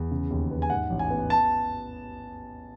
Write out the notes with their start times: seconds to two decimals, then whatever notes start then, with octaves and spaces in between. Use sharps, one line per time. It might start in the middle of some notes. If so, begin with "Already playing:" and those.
Already playing: E2
0.11 C#3
0.30 D#2
0.51 B3
0.62 G#5
0.70 G#2 F#5
0.90 A1
0.99 G#5
1.10 B3
1.30 A5